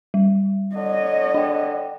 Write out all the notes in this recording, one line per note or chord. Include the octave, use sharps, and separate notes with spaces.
G3
D3 C#5 D#5
D4 G5